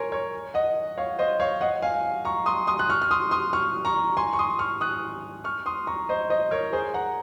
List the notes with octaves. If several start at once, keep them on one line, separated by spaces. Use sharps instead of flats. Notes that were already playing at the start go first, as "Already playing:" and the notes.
Already playing: A#4 C#5 G#5 C6
A#4 C#5
D#5 F#5
C#5 F5
C5 D#5
C#5 F5
D#5 F#5
F5 G#5
A#5 C#6
C6 D#6
C6 D#6
F#6
C#6 F6
F6
C6 D#6
C6 D#6
C#6 F6
A#5 C#6
G#5 C6
C#6
C6 D#6
C#6 F6
D#6 F#6
C#6 F6
C6 D#6
A#5 C#6
C5 D#5
C5 D#5
A#4 C#5
G#4 C5
F#5 A#5